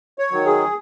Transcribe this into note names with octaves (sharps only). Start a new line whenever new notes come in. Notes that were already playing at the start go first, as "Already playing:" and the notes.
C#5
D#3 F#3
G#4